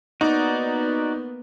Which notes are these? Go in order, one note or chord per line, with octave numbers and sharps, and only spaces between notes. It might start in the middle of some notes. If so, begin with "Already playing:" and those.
A#3 B3 D#4 F#4 D5